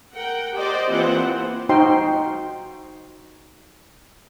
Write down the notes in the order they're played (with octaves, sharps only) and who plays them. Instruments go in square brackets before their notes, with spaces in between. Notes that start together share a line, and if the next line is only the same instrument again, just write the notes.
[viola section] A#4 F#5 G5
G4 C5 D5 D#5
E3 A#3 C4 F4 C5 F#5
[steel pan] D#4 F#4 C5 F5 G5 C6